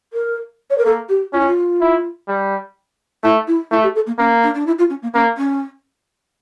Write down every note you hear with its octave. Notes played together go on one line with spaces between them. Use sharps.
A#4
C#5
A#4
A#3 A4
G4
C#4 F4
E4
F4
E4
G3
A3 E4
E4
A3 E4
G4
A4
A#3
A#3 C#4
D4
D4
E4
F4
C#4
A#3
A#3 C#4
C#4